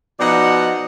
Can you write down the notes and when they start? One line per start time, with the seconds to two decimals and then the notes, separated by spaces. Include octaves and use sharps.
0.20 B2 F3 D#4 D5 F#5